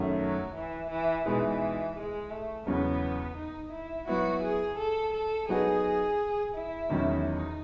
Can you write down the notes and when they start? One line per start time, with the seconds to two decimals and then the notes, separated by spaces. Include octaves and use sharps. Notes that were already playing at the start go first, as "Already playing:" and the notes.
Already playing: F#2 D#3 A3 C#4 F#4
0.20 F#3
0.55 E3
0.90 E3
1.25 B2 E3 G#3 D#4 G#4 B4
1.97 G#3
2.31 A3
2.67 E2 C#3 F#3 B3 C#4
3.37 D#4
3.72 E4
4.07 F#3 B3 E4 F#4
4.43 G#4
4.78 A4
5.13 A4
5.48 F#3 B3 D#4 F#4 G#4 B4
6.54 E4
6.89 E2 D#3 F#3 C#4
7.25 D#4